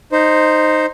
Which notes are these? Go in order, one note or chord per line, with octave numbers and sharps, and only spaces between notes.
D#4 C5